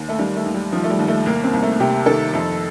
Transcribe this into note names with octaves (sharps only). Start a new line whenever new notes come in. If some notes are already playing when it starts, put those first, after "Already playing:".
Already playing: D#2
A3
D#3 G3
A3
D#2
G3
D#3 F3
A3
G3
D#2
A3
C2 A#3
C4
C2
A3
C3 G4
D#3 A4
F2